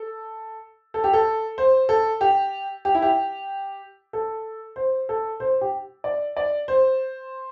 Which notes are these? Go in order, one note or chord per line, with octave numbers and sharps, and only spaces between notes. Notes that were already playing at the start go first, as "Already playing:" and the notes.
Already playing: A4
A4
G4
A4
C5
A4
G4
G4
E4
G4
A4
C5
A4
C5
G4
D5
D5
C5